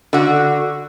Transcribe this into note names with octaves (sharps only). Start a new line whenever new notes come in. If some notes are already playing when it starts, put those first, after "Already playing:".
D3 F#4